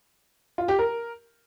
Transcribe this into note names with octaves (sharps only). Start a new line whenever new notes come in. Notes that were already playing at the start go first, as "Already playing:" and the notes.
F4
G4
A#4